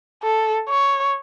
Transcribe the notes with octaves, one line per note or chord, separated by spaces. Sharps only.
A4
C#5